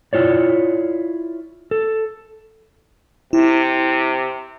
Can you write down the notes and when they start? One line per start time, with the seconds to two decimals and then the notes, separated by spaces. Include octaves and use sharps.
0.13 E4 F4 C#5 D5
1.71 A4
3.33 C3 E4